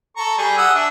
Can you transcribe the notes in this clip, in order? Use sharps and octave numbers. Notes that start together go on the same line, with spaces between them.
A4 A#5 C#6
G3 G#4
F#5 D#6 E6
D4 E5